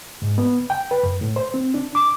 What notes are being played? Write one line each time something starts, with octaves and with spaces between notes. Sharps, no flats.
G#2
B3
G5
B4
F#2
A2
C5
C4
D4
D6